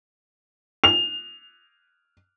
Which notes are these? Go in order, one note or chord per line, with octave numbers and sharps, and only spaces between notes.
F7